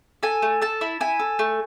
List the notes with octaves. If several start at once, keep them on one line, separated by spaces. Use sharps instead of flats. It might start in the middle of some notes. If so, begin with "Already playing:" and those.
A4 G#5
A3
A4 A5
E4
E4 G#5
A4
A3